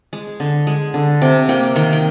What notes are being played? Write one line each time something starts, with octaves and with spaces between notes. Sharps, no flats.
G#3
D3
G#3
D3
C3 G5
A#3 G5
D#3 G5
G5